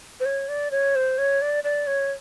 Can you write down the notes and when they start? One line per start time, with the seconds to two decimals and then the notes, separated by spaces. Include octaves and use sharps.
0.20 C5
0.25 C#5
0.49 D5
0.71 C#5
0.96 C5
1.18 C#5
1.42 D5
1.64 D5
1.87 C#5